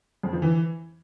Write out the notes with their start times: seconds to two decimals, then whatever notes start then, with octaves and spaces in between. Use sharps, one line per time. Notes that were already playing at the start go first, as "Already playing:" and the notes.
0.23 F2
0.33 F3
0.42 E3